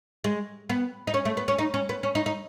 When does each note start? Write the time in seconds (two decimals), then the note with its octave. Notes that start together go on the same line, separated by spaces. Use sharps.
0.24 G#3
0.70 B3
1.07 D#4
1.14 C#4
1.25 A3
1.37 B3
1.48 C#4
1.59 D#4
1.74 C#4
1.89 B3
2.03 C#4
2.15 D#4
2.26 D#4